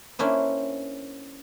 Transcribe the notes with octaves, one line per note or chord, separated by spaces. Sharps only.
A#3 C#4 D4 E4 C5